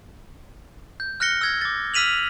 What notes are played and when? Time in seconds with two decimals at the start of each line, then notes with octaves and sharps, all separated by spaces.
1.00 G6
1.20 F6 F#6 A#6 C#7 G7
1.41 E6 G#6 A#6
1.61 D6 A6
1.94 E6 F6 B6 D#7 F7 F#7